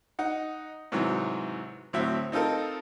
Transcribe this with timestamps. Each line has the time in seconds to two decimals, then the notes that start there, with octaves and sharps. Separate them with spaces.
0.19 D#4 F#5
0.92 G#2 C3 D#3 E3 F#3
1.93 D2 A2 F#3 C4 E5
2.32 C4 D#4 F4 A4 A#4